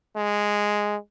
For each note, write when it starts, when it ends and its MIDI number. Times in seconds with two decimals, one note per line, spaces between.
0.16 0.96 56